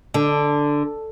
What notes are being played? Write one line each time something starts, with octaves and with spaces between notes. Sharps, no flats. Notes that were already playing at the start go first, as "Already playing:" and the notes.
D3